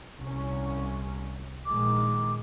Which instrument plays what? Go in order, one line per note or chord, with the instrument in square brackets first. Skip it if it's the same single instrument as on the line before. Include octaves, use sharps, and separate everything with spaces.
[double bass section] C2 C#4
[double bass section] A#1 D#3 G#3 [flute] D6